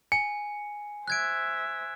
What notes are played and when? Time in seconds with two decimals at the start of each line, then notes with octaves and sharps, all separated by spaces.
0.12 G#5 C#7
1.08 C5 E5 F#6 G#6 D7